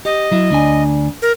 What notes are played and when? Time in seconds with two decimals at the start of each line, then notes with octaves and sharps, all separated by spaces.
0.05 G4 D#5
0.31 F#3 E4
0.50 D2 D4 G#5
1.22 A#4